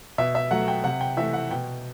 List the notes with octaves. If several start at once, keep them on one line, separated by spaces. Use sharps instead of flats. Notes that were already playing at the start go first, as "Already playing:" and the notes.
B2 E5
E5
F#3 A3 F#5
G5
C3 F#5
G5
E3 A3 E5
F#5
B2 G5